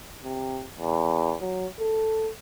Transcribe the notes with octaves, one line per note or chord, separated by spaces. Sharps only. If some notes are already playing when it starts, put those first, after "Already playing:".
C3
E2
F#3
A4